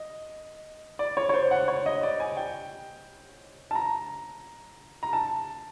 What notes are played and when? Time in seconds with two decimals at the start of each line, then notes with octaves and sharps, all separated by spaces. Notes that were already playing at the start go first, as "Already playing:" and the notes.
Already playing: D#5
0.99 D5
1.17 C#5
1.29 C#5
1.34 C5
1.51 F#5
1.68 C#5
1.86 D#5
2.03 D5
2.20 G#5
2.37 G5
3.71 A5
3.75 A#5
5.03 A#5
5.13 A5